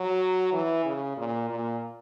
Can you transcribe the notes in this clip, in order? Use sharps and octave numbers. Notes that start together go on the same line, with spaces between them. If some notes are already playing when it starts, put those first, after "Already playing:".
Already playing: F#3
E3
C#3
A#2
A#2